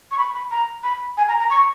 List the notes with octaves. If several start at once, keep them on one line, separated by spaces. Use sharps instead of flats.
C#6
B5
B5
A#5
B5
G#5
A#5
A#5
C#6